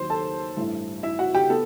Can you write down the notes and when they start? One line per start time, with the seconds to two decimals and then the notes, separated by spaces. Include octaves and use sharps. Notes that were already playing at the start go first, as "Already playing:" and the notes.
Already playing: D#2 D#3 F#3 C5 C6
0.10 A4 A5
0.57 A1 G2 E3 A3 E4
1.03 E4 E5
1.19 F#4 F#5
1.35 G4 G5
1.50 B3 A4